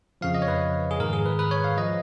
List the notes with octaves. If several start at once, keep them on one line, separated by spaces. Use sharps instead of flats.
F2 C#3 F3 F5
D#5
C#5
B4
G#4
G#2 D#3 A#4
G#4
B4
B4
C#5
F5
F3 D#5